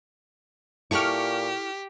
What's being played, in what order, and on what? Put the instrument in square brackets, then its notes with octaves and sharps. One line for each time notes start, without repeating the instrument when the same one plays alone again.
[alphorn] A#2 [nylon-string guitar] E4 A4 [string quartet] G4 [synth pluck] C#6 D6 F6